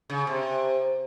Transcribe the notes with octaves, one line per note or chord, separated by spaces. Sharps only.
C#3
C3